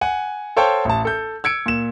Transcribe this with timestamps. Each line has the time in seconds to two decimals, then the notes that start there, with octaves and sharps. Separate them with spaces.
0.01 F#5 G#5
0.57 A4 C5 C#5 F5 G5 A5
0.85 A1 A5
1.05 A4 G6
1.44 E6 G#6 C#7 D7
1.66 A#2 E7